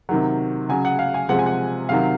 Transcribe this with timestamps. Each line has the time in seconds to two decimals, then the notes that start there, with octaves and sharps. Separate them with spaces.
0.09 C3 D#3 F#3
0.69 C#3 F#3 G#5
0.85 F#5
0.99 F5
1.14 G#5
1.29 C3 F3 G#3 F#5
1.39 G#5
1.46 F#5
1.89 C3 D#3 F#3 F5